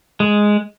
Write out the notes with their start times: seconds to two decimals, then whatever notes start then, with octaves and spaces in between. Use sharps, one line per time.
0.20 G#3